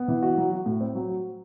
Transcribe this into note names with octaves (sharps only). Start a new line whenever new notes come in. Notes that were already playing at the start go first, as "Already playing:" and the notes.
Already playing: B3
E3
F#4
F#3
F#4
A2
C4
F#3
F#4